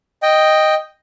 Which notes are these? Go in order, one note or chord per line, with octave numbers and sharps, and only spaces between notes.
D#5 G5